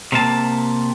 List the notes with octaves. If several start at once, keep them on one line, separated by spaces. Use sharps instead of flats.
C3 A#3 A5